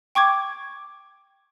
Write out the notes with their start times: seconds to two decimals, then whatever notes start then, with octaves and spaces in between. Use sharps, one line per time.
0.15 G5 C#6 D6 G#6